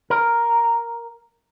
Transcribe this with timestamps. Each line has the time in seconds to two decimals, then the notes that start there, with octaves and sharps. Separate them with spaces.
0.10 A#4